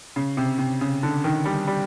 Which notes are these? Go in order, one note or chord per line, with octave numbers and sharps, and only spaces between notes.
C#3
C3
C3
C#3
D3
D#3
G3
G3